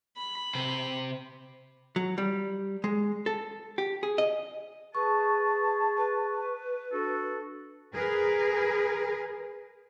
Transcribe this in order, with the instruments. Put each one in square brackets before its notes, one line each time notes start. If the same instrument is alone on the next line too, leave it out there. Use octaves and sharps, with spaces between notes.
[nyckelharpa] B5
[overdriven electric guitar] C3 C5
[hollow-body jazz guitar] F#3
G3
G#3
A4
G4
G#4
D#5
[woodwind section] G#4 A5 [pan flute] B4 [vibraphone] C#6
[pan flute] B4
[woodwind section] D4 F#4 A4
[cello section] G#4 A#4 B4